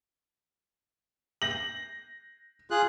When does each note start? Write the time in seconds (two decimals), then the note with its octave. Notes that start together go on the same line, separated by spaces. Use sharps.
1.42 A#6 F#7
2.71 F4 G#4 F#6